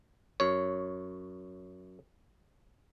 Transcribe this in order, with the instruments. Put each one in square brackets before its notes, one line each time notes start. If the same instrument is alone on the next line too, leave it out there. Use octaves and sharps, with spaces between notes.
[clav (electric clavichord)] F#2 C#5